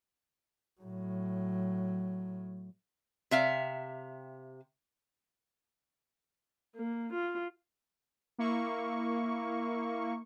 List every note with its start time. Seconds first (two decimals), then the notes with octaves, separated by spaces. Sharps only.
0.81 A2 F#3
3.31 C3 E5 F5
6.76 A#3
7.13 F4
8.38 A#3 E4 C#6